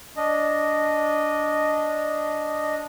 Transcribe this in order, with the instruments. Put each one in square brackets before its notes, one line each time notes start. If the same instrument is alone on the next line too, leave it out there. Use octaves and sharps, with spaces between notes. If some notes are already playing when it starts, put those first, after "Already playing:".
[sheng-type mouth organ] D4 D#5